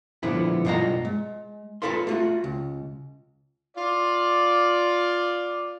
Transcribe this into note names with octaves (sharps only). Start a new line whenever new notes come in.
G2 A#2 D3 F3 B3 E4
B1 G2 F4 D#5 F#5 A#5
G#3
F4 G4 A4 B4 F5 C6
A3 F4 F#4
C#2
F4 D5